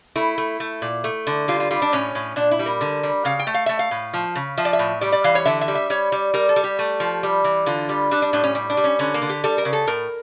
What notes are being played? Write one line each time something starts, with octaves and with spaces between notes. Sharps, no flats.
A3 E4
A3
A3
A#2
A3
D3
G3 F4
F4
G3 F4
D4
A2 C#4
A2
A#2 D4
E4
G3
A#4
D3
G3
C#3 F5
G5
A3
F5
A3 E5
F5
A2
F3
C#3
F3 E5
D5
E5
A2
G3 D5
D5
E3 F5
C#5
D3 E5
E5
G3
E5
G3 C#5
G3
G3 A#4
A4
G3
G4
A3
F3
G3
E3
D3 F4
G3
G3 D4
D4
A2 D4
C#4
G3
D4
G3
C#4
D3 C#4
A#3
D3
G4
G3 A4
A#4
C#3
A4
A2 A#4